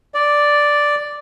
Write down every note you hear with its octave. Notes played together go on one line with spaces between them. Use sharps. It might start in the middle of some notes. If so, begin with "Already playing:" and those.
D5